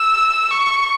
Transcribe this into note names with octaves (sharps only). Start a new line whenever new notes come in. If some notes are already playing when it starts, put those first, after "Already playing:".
Already playing: E6
C#6